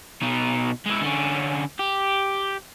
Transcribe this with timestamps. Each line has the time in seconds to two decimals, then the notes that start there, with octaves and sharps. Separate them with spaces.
0.21 B2 D#4
0.86 G#3 E4
1.02 D3 C#4
1.79 G4